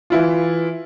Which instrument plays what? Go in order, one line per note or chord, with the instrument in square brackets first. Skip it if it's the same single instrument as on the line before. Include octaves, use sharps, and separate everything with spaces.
[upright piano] E3 E4 F4